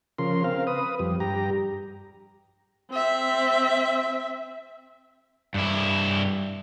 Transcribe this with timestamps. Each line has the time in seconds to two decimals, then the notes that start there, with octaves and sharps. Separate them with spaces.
0.18 C#3 F3 A#4 C6
0.44 C4 A#4 F5
0.67 B4 D#6
0.99 F2 G3
1.20 G2 G4 A#5
2.91 C4 E5
5.54 G2 E4